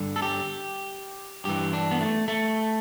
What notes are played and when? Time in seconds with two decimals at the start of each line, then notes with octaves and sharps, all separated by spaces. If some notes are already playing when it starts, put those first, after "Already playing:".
Already playing: G2 D3
0.16 A4
0.22 G4
1.45 G2 E3 G4
1.73 D4
1.91 B3
2.01 A3
2.28 A3